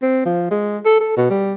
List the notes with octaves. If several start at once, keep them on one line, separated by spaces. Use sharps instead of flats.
C4
F3
G#3
A4
A4
B2
G3